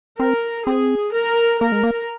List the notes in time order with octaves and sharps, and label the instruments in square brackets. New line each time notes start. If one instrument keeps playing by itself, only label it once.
[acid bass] C4 [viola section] A#4
[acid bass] C4 [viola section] G#4
[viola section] A#4
[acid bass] A#3 [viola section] A#4
[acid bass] G#3
A#3